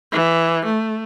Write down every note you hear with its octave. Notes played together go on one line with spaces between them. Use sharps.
E3
A3